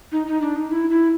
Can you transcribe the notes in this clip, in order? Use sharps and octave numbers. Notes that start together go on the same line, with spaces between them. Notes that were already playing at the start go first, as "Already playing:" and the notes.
D#4
D#4
D4
D#4
E4
E4